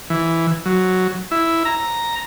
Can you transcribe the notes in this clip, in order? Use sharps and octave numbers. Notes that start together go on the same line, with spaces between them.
E3
F#3
E4
A#5